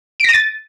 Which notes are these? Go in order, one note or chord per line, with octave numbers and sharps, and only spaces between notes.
A6 A#6 D7 D#7